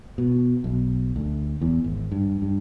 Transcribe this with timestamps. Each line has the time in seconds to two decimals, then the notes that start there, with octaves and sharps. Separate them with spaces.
0.18 B2
0.64 B1
1.16 D2
1.61 E2
1.84 G#1
2.12 G2
2.42 G2